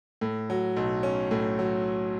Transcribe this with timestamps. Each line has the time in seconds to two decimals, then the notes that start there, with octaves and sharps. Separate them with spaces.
0.21 A2
0.50 F#3
0.77 B1
1.03 C#4
1.31 A2
1.59 F#3